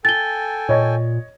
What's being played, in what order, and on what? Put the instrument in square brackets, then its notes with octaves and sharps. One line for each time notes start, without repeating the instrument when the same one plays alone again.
[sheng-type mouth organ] A4 G5 G#5 [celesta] A6 G7
[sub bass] A#2 [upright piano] C#5 D#5 G#6